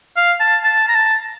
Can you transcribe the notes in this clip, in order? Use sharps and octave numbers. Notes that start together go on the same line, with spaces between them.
F5
A5
A5
A#5
A5